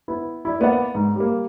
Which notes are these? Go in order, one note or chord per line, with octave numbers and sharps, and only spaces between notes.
B3 E4
E4 D5
A#3 B3 D5 E5 F#5
G#2
G3 A#3